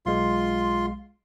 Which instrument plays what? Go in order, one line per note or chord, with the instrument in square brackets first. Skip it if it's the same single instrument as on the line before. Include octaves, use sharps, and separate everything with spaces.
[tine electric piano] B1 G#3 [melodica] F4 C6